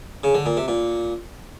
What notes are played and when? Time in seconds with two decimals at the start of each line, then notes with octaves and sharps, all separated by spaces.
0.24 C#3
0.35 D3
0.46 A#2
0.57 C3
0.68 A#2